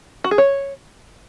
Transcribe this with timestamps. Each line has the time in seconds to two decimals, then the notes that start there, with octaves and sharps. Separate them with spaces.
0.24 F#4
0.31 G#4
0.38 C#5